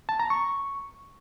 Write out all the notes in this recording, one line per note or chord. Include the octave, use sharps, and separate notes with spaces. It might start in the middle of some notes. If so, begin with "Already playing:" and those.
A5
A#5
C#6